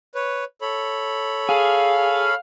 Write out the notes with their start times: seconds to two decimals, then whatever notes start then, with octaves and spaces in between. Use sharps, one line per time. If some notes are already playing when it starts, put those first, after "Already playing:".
0.15 B4 C#5
0.61 A4 C#5 B5
1.49 G#4 F5